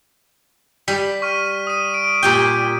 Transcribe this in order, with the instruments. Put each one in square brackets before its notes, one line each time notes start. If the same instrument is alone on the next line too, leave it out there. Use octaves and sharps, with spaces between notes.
[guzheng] G3 [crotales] B6
[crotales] C#6 F6 D#7
D#6 D#7
D7
[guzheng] A#2 G4 G5